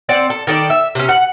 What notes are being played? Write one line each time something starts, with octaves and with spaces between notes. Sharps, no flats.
C4 D5 F#5
A4
D#3 A4 D5
E5
C3 C#4
F#5